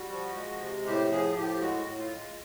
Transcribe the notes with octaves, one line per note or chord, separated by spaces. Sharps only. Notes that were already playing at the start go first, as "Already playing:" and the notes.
Already playing: G3 F#4
F3
G#3
C3
A2 G4
F3 G#4
A2 G4
G#3 F#4
A2
F4
G#3